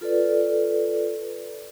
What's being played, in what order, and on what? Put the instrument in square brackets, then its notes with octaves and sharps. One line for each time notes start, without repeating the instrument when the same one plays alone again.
[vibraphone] F4 A4 B4 D5